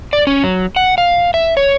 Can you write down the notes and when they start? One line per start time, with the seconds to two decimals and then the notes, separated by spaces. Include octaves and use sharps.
0.13 D5
0.27 C#4
0.44 F#3
0.76 F#5
0.98 F5
1.34 E5
1.57 C#5